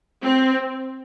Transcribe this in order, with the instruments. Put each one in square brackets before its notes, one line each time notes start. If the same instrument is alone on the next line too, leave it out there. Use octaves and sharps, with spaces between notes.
[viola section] C4